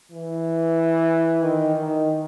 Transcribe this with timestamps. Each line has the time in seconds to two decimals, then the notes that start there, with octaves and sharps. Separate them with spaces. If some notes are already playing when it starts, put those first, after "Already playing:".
0.12 E3
1.43 D#3
1.76 D#3